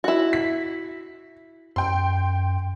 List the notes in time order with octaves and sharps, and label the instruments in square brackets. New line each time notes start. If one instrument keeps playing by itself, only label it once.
[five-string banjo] E4 F#4
[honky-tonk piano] B6
[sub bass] F#2 [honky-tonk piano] G5 C6